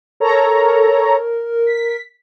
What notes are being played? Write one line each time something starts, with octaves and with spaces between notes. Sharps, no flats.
A4 A#4 C#5 A#5
B6